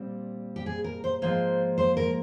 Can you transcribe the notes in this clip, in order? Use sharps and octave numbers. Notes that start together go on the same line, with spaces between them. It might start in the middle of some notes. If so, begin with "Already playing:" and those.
Already playing: A#2 G3 C4
G4
G#4
A#4
C5
G#2 F3 A#3 C5
C5
A#4